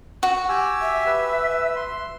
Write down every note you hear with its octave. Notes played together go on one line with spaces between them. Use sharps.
F#4
G4 G#5 E6
E5
B4 E6
C6